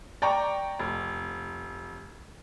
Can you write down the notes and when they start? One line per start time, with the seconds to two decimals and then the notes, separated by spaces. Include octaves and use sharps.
0.22 D5 G5 A#5 C#6
0.79 F1